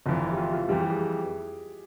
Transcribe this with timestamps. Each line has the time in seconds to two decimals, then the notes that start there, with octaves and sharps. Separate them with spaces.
0.06 G1 F2 E3 F4
0.21 E4
0.31 G4
0.37 F4
0.53 F4
0.69 F2 E3 G3 G4
0.80 G4
0.90 G#4